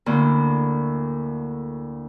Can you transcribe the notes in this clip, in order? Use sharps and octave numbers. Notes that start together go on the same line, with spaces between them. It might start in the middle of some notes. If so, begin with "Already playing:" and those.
D2 A2 D3 A#3